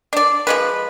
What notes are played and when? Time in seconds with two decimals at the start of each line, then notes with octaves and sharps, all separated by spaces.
0.13 D4 D5
0.47 F3 G#3 B4